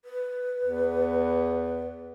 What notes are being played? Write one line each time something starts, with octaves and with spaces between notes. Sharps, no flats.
B4
E2